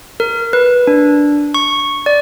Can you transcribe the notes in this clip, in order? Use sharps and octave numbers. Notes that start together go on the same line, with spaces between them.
A#4
B4
D4
C#6
D5